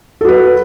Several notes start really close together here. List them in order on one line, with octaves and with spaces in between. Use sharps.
A4 F#4 B4